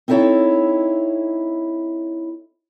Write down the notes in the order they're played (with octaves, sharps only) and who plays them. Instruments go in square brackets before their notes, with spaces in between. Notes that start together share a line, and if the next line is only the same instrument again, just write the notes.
[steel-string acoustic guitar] C4 D#4 E4 A4 C#5